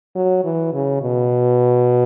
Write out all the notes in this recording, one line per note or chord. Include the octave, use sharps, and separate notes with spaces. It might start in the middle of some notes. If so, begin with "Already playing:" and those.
F#3
E3
C#3
B2